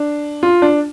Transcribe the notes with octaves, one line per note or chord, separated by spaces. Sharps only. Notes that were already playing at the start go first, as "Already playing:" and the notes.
Already playing: D4
F4
D4